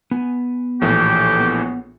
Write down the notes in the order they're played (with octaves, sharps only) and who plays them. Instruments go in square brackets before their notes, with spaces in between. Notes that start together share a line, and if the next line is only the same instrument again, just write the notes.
[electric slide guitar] B3 G#5
[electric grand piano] A#1 A2 E3 [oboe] G4
[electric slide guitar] B3